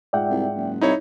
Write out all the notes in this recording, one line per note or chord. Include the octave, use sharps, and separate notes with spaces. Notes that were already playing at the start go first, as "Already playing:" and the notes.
G#2 F4 D5 E5 F#5 G5
C2
F#1
C2 D#4 E4 C#5